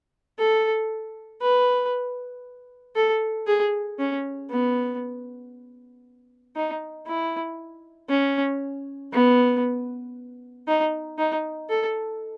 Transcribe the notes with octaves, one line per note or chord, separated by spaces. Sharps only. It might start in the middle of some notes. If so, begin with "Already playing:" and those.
A4
B4
A4
G#4
C#4
B3
D#4
E4
C#4
B3
D#4
D#4
A4